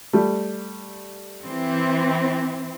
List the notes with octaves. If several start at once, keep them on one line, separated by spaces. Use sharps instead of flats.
G3 A3
E3 C4